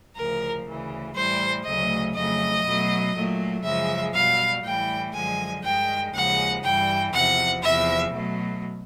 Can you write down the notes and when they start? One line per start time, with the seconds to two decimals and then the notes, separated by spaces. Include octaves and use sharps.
0.16 D2 C#3 F3 A#4
0.66 D2 C#3 E3
1.14 A2 E3 G3 C5
1.64 D2 C#3 F#3 A3 D#5
2.14 F2 C#3 F#3 A3 D#5
2.64 B2 F#3 A3
3.13 A#2 F#3 A3
3.64 F#2 C#3 F3 G#3 E5
4.13 B2 G3 F5
4.63 A2 E3 G3 G5
5.13 F#2 D3 F3 G#3 G#5
5.62 G2 D#3 G#3 G5
6.12 D#2 C#3 F3 G#3 F#5
6.63 G2 E3 G3 G5
7.12 E2 C3 F3 F#5
7.62 E2 C3 F3 E5
8.12 B2 F#3 A3